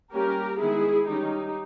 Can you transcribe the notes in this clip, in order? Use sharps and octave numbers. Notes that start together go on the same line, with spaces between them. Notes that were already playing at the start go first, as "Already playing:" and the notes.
G3 A#3 C#4 G4 A#4
D#3 G#3 B3 E4 G#4
D#3 G3 C#4 D#4 G4